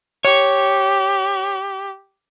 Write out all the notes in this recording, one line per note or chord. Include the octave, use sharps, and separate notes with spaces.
G4 C#5